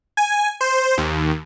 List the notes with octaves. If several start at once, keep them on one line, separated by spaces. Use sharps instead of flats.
G#5
C5
D#2